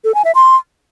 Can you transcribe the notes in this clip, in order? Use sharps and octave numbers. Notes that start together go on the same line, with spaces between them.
A4
G#5
E5
C6